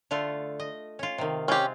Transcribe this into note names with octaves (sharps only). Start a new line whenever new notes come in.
D3 A3 F4
D#5
C#4 F4
C3 D#3
G#3 C4 C#4 F4 G4